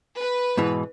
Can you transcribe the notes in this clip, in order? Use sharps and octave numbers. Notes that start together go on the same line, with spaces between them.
B4
G#2 B2 E3